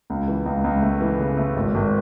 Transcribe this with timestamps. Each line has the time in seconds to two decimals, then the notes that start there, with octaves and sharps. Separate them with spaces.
0.10 C#2
0.28 E3
0.46 C#2
0.64 C#2
0.82 A3
1.01 E3
1.19 C#3
1.37 A3
1.56 G#1
1.75 G#1